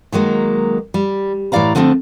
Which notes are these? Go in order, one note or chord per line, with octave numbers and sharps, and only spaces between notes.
D#3 F#3 G#3 A#3
G3
A2 E3 E4 D5 F5 A#5
D3 F3 A3 A#3 C4